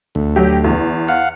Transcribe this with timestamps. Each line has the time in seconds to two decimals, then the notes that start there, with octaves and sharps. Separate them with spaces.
0.15 D2
0.36 F#3 G4
0.64 E2
1.08 F5 F#5